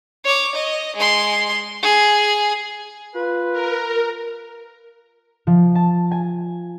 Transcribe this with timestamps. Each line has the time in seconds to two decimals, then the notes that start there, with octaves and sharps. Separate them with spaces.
0.24 C#5 D6
0.55 D#5
0.96 G#3 C6
1.83 G#4
3.15 F4 B4
3.52 A#4
5.47 F3
5.75 A5
6.11 G#5